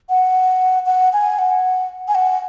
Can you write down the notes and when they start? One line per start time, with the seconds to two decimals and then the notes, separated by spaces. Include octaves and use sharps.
0.09 F#5
0.86 F#5
1.13 G#5
1.39 F#5
2.08 G#5
2.15 F#5